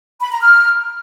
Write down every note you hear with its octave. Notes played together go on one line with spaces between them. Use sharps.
B5
A#5
F6